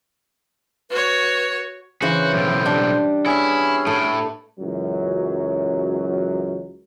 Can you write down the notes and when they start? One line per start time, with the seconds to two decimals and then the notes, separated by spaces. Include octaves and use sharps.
0.91 F#4 B4 C#5
2.02 C#3 E3 F#4 C5
2.33 B1 A2
2.65 G3 D4 G5
3.26 B3 C#4 E4 G#4 C#5 E5
3.87 A2 A3
4.60 C#2 F#2 E3 F#3